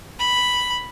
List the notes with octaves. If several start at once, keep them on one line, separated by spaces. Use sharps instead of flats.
B5